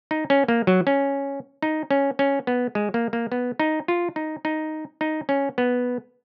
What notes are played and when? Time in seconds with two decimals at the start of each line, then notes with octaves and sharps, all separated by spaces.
0.11 D#4
0.30 C#4
0.48 A#3
0.67 F#3
0.87 C#4
1.62 D#4
1.91 C#4
2.19 C#4
2.47 B3
2.75 G#3
2.94 A#3
3.13 A#3
3.32 B3
3.60 D#4
3.88 F4
4.16 D#4
4.45 D#4
5.01 D#4
5.29 C#4
5.58 B3